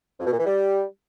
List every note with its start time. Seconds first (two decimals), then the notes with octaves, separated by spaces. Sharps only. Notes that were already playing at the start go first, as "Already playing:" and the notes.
0.20 F2
0.26 B2
0.33 A#2
0.39 E3
0.45 G3